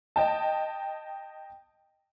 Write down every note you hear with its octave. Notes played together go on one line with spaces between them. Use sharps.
D#5 G5 A5